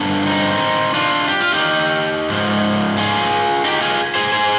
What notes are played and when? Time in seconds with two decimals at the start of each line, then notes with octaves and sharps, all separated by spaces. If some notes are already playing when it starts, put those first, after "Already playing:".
Already playing: G2 D3 F3 B3 D4
0.27 C4 D#4
0.94 D4 F4
1.28 G4
1.40 F4
1.53 D#4 G4
2.30 G#2 F3
2.97 F4 G#4
3.65 D#4 G4
3.81 F4 G#4
4.15 G#4 C5
4.32 G#4 C5